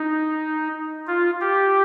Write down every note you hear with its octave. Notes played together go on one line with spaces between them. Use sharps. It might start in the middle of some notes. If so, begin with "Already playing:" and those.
Already playing: D#4
F4
G4